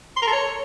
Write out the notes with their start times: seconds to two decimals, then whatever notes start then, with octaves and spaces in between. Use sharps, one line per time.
0.16 C6
0.22 A#4
0.27 A4
0.33 C#5